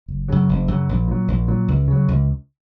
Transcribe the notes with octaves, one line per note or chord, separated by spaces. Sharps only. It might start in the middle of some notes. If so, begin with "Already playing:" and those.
F#1
F#2 C#3 F#3
F#1
F#2 C#3 F#3
A#1
A#2 F#3
A#1
A#2 F#3
C#2
C#3 F#3
C#2